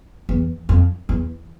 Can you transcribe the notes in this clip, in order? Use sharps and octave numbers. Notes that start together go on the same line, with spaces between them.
E2
F2
E2